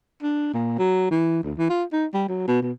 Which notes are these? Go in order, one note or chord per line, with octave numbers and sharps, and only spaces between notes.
D4
A#2
F#3
E3
D2
E3
F4
D#4
G3
F#3
B2
B2